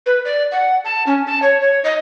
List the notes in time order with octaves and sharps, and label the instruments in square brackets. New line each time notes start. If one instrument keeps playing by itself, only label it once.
[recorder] B4
D5
F#5
A5
C#4
A5
C#5
C#5
D#5